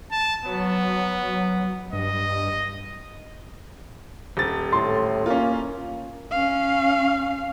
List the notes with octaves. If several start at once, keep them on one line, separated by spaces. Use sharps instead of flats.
A5
F#3 B3
G2 D#5
D#1 A6
A2 C6
A#3 C#4 F4
C#4 F5